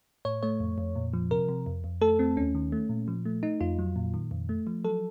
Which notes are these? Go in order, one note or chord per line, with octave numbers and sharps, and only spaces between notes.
A2 C#5
A3 C#5
F2
F2
A#2
F3
C3 A#4
C3
F2
F2
A3 A4
A3 C4
D#2 C#4
D#3
A3
A#2
F3
A3
A3 D#4
F2 F4
F#3
A#2
D#3
F2
A3
F3
F#3 A4